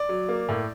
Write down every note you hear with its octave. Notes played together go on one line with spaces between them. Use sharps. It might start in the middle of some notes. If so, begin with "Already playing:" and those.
Already playing: D5
F#3
A#3
A2